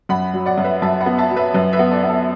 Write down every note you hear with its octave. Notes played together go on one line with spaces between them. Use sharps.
F#2 F#5 B5
F#3
D5 F#5
F#2
B4 E5
F#2 E5 A5
F#5 B5
B3
E5 A5
F#3
B4 E5
F#2 B4
B4 E5
B3
A4 D5
B3
A4